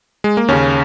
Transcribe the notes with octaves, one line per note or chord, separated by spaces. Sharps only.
G#3
A#3
D#2 C#3 C#4